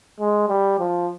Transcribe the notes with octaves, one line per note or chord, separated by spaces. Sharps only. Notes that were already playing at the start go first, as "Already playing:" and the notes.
G#3
G3
F3